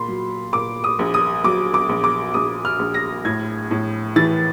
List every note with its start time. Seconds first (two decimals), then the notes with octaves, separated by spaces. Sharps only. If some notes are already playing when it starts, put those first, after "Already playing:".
Already playing: A#2 B5 C6
0.08 F#3
0.53 A#2 D6
0.84 D#6
0.99 A#1
1.14 D#6
1.44 F#3 D6
1.74 D6
1.89 A#1
2.04 D6
2.34 A#1 D#6
2.65 F6
2.79 A#1
2.94 A#6
3.25 A2 G#6
3.71 A2
4.16 E3 A6